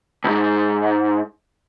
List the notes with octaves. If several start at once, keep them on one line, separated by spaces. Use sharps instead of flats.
C#2 G#2